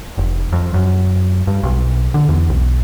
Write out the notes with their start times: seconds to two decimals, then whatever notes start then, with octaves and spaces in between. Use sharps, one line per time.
0.18 F1
0.53 F2
0.74 F#2
1.47 G2
1.63 B1
2.14 D3
2.29 E2
2.49 B1